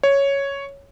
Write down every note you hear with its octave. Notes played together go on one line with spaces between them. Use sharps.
C#5